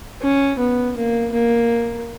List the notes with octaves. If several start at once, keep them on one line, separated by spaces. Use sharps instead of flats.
C#4
B3
A#3
A#3